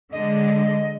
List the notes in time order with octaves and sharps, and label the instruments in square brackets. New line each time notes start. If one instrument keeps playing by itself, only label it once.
[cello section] D3 G#3 [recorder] D#5